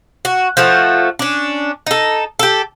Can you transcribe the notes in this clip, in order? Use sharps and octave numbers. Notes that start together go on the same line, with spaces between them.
F#4
F3 A3 F#4
C#4 D4
D#4 A4
G4 A4